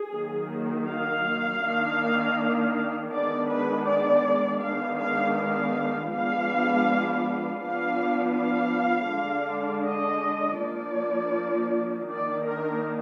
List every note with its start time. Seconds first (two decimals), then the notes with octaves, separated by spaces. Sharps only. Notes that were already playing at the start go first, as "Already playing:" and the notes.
Already playing: G#4
0.12 D#3 F#3 A#3
0.87 F5
1.62 D#3 A#3 D4
3.12 D#3 G#3 B3 D4 D5
3.49 B4
3.86 D5
4.61 D#3 G#3 B3 D4 F5
4.99 F5
5.35 F5
6.11 F3 G#3 B3 D4 F5
7.60 F3 B3 D4 F5
8.35 F5
9.09 D3 G#3 D4
9.85 D#5
10.59 F3 A#3 D4 D5
12.09 D#3 A#3 D4 D5
12.46 A#4